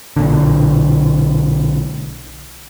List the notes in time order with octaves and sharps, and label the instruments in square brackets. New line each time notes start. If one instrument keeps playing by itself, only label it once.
[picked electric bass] B1 A#2 D3